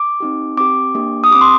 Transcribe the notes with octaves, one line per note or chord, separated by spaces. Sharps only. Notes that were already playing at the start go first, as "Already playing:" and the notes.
Already playing: D6
C4 D#4 G4
C4 G4 D6
A#3 D4 G4
D#6
C4 G4 D6
C6